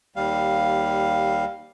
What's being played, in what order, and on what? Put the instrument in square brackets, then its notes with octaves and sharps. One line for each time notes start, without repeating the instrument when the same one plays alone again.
[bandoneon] D#2 G3 F5